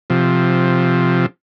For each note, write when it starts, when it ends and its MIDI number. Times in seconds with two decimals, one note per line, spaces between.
0.10 1.26 48
0.10 1.26 53